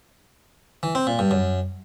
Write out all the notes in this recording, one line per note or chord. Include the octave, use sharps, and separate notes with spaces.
E3
C4
A#2
G2
F#2